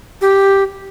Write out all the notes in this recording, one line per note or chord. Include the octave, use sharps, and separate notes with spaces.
G4